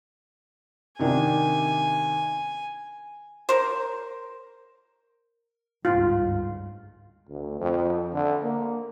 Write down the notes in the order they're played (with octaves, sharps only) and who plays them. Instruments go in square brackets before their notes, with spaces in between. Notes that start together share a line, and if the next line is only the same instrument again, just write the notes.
[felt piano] C3 D#3 D4 [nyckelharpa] G#5
[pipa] A#4 C5
[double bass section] G1 C#2 G#2 [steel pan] F4
[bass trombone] D2
F2
D3
A#3